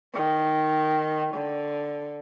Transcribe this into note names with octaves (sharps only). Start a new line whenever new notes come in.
D#3
D3